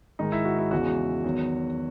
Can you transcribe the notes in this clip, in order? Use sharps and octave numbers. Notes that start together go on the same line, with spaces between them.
G#2 D#3 G#3 D#4
E4
F#4
E4
E2 C#3 E3 G#3 F#4
E2 D#3 F#3